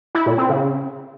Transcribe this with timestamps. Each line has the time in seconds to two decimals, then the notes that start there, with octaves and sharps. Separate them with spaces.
0.15 E4
0.26 A#2
0.38 C4
0.50 C#3